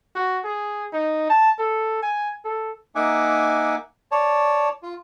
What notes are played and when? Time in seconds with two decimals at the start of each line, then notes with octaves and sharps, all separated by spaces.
0.15 F#4
0.44 G#4
0.93 D#4
1.29 A5
1.59 A4
2.03 G#5
2.44 A4
2.95 A#3 D#4 E5 F#5 G#5 D6
4.12 C#5 D5 A5
4.83 F4